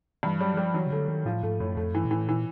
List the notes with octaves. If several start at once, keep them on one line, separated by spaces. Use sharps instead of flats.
G2 E3
F#3 G3
E3
F3 G3
E3 F#3
C#3
D3 A3
D#3 A3
A2 F3
G#2 A3
F#2 A2
F2 A3
G2 E3
A#2
A2 E3
A#2 E3